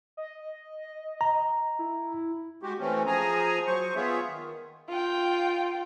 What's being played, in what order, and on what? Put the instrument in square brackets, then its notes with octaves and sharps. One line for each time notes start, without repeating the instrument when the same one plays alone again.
[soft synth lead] D#5
[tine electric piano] A#5
[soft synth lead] E4
[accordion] G#3 F#4 G4
E3 A3 C4 C#4
F3 G#4 G#5 A#5
F#3 C5 C#6
B3 F4 G#4 C#5 E5
D#3
[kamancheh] F4 G5